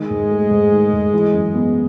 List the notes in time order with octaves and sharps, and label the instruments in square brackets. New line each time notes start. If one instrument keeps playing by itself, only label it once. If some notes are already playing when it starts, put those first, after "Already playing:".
Already playing: [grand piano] D#3 [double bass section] G#3
[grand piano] G#2
A3
G#2
D#3
G#2
E3
F#2
B3